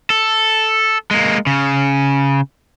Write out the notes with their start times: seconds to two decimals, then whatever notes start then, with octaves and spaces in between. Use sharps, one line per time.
0.10 A4
1.11 G#3 A#3
1.47 C#3